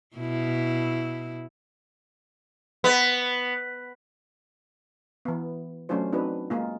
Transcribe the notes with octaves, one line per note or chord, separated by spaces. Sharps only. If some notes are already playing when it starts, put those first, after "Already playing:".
B2 E4
B3
E3 B3
F#3 A3 C#4 D4 F4 C5
C4 D4 D#4 F#4 B4
G#3 A#3 F4